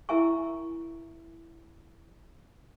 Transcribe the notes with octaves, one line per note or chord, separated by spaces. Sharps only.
E4 A#4 E5 G#5 C#6